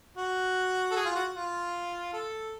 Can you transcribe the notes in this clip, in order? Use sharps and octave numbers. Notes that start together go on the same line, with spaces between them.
F#4
A4
G#4
F4
F#4
F4
A4